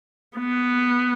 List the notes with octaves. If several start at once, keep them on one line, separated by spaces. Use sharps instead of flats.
B3